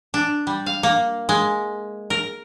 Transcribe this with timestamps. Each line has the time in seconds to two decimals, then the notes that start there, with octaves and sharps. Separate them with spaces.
0.14 D4
0.47 G3
0.66 F5
0.83 A#3
1.29 G#3
2.10 A#4